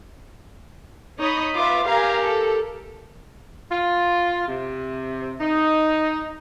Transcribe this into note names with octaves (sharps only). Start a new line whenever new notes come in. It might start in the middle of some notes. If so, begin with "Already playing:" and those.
D#4 C#5 D#5 B5
F4 B4 E5 D6
G4 A#4 F5 G#5 A#5
A4
F4
C3
D#4